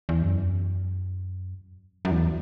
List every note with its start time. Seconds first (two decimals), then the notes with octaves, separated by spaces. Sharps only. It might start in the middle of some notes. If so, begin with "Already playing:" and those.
0.09 E2
0.22 F#2
2.05 F#2
2.11 E2